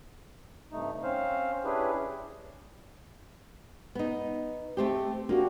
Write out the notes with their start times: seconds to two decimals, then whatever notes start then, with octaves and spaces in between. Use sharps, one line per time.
0.72 G2 C3 A3 D#4
1.03 C4 C#4 C5 F5
1.65 C#4 D4 E4 G4 G#4 B4
3.95 B3 D#4
4.77 A3 C4 G4
5.29 A#3 D4 F#4 G4